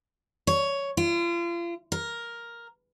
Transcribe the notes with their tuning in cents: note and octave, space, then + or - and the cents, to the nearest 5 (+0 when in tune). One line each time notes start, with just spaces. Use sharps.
C#5 +10
F4 -35
A#4 +5